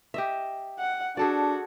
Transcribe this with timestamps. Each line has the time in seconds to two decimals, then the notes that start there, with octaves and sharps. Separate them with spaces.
0.14 G4 D#5 E5
0.79 F#5
1.17 D4 F#4 G#4 A4 D5